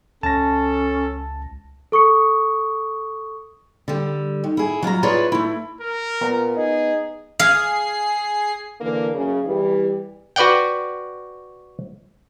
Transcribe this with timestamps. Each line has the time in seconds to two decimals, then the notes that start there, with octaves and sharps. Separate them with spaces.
0.23 C#2 C#4 A4 A5 A#6
1.92 A4 C#6 D#6 C#7
3.88 D3 G3
4.44 D#3
4.57 E4 G#4
4.83 F#3 F4 E5 A#5
5.03 E4 F4 G#4 B4 C#5 D5
5.32 A3 E4
5.81 A#4
6.21 A#2 B3 A#5
6.57 D#4 G#4
7.40 G#4 F5 C7
8.81 D3 E3 A#3
9.13 F#2 C#3
9.44 E2 E3 G3
10.36 F#4 B4 D5 F#5 G5